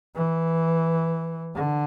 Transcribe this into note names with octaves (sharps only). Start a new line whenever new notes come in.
E3
D3